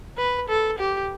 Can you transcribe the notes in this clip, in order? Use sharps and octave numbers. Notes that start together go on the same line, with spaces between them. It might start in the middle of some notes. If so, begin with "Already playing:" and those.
B4
A4
G4